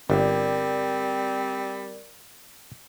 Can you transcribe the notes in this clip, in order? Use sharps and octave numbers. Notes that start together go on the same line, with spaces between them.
G1 G3 C4 A#4 D5